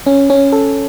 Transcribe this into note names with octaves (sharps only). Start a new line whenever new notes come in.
C#4
C#4
A4